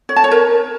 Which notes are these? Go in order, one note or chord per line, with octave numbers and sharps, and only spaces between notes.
C#5
A5
C#5
A#4